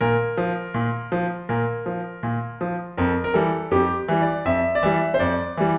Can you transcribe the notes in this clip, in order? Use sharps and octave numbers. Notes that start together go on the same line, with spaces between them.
A#2 A#4
F3
A#2
F3
A#2 A#4
F3
A#2
F3
F2 A#4
A#4
E3 G3 A4
F2 G4
E3 G3
D5
F2 E5
D5
E3 G3 E5
C5
F2 D5
E3 G3